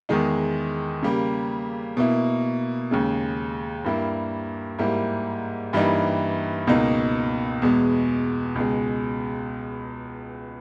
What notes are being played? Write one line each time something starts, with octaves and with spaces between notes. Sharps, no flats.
E2 D#3 G#3 D#4
C#3 G3 A#3
B2 A#3 E4
D#2 C#3 G#3
G2 G3 A#3 E4
G#2 G3 A#3 E4
G2 E3 G3 A#3 D#4
C#2 B2 A#3 D#4
E2 B2 G#3
C#2 B2 G#3